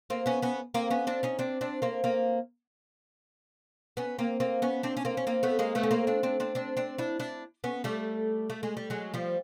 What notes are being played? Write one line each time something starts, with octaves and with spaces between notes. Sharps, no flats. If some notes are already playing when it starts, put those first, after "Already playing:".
A#3 C4
B3 C#4
B3 C#4
A#3 C4
B3 C#4
C4 D4
C#4 D#4
C4 D4
C4 D4
A#3 C4
A#3 C4
B3 C#4
A#3 C4
A#3 C4
B3 C#4
C4 D4
C#4
A#3 C4
C#4
A#3 C4
A3 B3
G#3 A#3
A3 B3
C#4
A#3 C4
C4 D4
C4 D4
C4 D4
C4 D4
C4 D4
D4 E4
D4 E4
B3 C#4
G3 A3
A3
G#3
G3
F#3 G#3
F3 G3